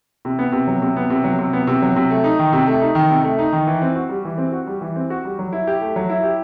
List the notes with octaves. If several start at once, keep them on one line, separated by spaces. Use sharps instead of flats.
C3
B3
C3
F#3
C3
B3
C3
F#3
C3
B3
C3
F#3
C3
A3
D#4
D#3
C3
A3
D#4
D#3
C3
A3
D#4
D#3
E3
C4
F#4
G3
E3
C4
F#4
G3
E3
C4
F#4
G3
F#3
E4
G4
A3
F#3
E4
G4